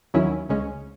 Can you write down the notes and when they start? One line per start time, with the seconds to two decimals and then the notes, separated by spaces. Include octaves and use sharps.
0.14 D#2 D#3 F#3 C#4 E4
0.49 C#2 C#3 G#3 C#4